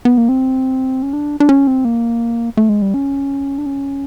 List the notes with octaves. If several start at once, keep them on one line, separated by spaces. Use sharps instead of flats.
B3
A#3
C4
C#4
D4
D4
C#4
C4
A#3
A3
G#3
G3
C#4
D4
C#4